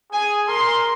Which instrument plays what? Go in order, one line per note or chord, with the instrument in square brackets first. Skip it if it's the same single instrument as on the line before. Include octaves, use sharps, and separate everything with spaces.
[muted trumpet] G#4 [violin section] G#5
[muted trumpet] A#4 [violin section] C6